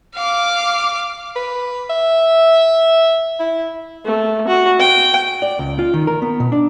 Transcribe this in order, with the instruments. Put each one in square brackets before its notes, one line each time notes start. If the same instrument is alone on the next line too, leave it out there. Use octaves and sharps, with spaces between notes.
[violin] F5 D6
[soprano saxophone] B4
E5
E4
[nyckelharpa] A3
F#4
G5
[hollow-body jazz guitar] D5
C#2
F4
D#3
A#4
B3
B2
D4